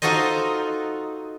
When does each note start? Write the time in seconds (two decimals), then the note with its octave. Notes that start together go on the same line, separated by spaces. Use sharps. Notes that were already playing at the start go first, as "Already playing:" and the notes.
0.02 D#4 F4 F#4 A4 C5 D#5